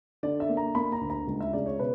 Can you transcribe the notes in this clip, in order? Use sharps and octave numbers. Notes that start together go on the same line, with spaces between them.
D3 D5
E5
A#3
A#5
A#3 B5
A#5
D2
A#5
C#2
E5
C#3 D5
C#5
B2 B4